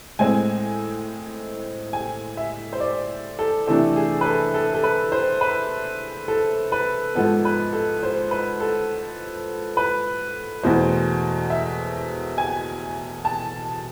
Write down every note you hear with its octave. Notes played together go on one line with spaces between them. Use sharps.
A2 G#3 C4 G#5
G#5
E5
C5
D5
A4
C3 E3 A3 D4 A4
G#4
B4
A4
A4
A4
B4
C5
B4
A4
B4
G#2 F3 B3 A4
B4
A4
C5
B4
A4
B4
E2 B2 A3 C5
E5
G#5
A5